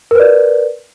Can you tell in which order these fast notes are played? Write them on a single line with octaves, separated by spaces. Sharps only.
A#4 B4 D5